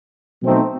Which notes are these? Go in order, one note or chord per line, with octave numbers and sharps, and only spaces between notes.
B2 F#3 A3 C4 D#4